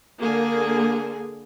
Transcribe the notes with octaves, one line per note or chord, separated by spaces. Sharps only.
D3 A#3 G#4